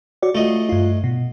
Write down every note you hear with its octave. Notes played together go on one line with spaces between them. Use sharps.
F#4 C#5 D5
A3 F4 F#4 D#5
G2 F4
B2